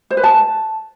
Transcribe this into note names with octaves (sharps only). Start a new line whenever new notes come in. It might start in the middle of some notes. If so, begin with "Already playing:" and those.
C5
B4
A5